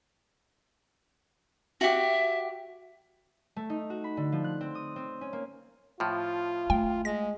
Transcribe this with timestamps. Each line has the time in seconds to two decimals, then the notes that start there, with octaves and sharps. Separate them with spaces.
1.81 F#4 G4 E5
3.56 A3
3.70 D#4
3.90 F#4
4.04 B5
4.17 D3
4.32 F3
4.44 F#6
4.61 C4
4.75 D#6
4.96 C4
5.21 C#4
5.33 A#3
6.00 A2 F3 F4
6.70 A3 G5
7.05 G#3 A#6